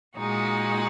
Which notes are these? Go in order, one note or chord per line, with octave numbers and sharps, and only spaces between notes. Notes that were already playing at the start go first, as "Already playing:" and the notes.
A#2 G#3 D#4 F#4